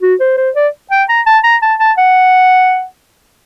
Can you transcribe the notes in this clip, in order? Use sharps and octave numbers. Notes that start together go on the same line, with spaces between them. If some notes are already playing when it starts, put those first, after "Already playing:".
F#4
C5
C5
D5
G5
A#5
A5
A#5
A5
A5
F#5